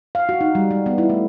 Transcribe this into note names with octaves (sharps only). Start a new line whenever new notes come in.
F5
F#4
D#4
G3
G#3
B3
E4
A3